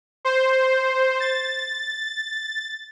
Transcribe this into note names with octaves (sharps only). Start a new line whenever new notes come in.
C5
A6